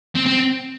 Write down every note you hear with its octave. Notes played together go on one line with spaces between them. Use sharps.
C4
C4